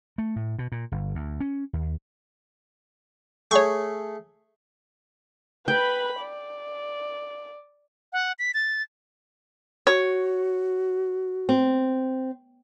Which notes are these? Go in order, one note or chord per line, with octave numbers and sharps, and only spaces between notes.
A3
A2
B2
A#2
G1
D2
C#4
D#2
A3 G#4 C#5 C#6
B4 G5 B5
D5
F#5
B6
A6
F#4 C#5
C4